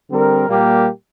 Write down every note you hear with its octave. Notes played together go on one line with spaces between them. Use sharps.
D3 G3 C4 A#4
A#2 G3 A#3 G4 A#4